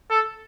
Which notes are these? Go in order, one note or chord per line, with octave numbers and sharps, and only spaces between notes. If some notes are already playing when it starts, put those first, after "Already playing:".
A4